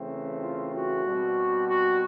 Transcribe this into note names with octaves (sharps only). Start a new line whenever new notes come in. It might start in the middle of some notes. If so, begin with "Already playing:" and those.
Already playing: C#3 E3 A3 C4
F4
F#4
B2 G3 C4
F#4